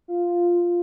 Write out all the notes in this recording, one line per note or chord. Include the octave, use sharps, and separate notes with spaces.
F4